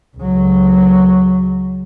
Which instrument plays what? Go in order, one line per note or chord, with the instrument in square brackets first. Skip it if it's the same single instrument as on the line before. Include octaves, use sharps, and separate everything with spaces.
[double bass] C#2 F#3